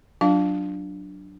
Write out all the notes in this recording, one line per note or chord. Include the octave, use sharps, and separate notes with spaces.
F#3 D4 F4 F5